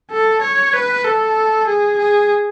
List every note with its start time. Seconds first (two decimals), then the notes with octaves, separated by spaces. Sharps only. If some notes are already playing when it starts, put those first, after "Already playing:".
0.11 A4
0.42 C#5
0.73 B4
1.04 A4
1.67 G#4
1.98 G#4